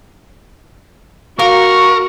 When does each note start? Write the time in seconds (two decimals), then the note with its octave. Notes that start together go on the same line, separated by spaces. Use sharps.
1.39 A#3 F#4 A#4 C#6